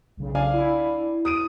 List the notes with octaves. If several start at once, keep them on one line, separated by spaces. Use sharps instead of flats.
B1 C#3
D4 F5 G#5
E4
D#6 D7 D#7